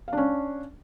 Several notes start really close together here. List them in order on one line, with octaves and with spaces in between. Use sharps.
F5 D4 C#4